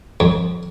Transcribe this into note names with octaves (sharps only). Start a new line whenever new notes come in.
F2